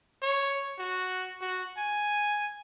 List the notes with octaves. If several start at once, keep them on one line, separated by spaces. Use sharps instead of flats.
C#5
F#4
F#4
G#5